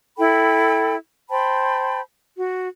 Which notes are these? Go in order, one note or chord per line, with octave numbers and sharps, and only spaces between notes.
E4 A4 G5 B5
C5 G5 A5 B5
F#4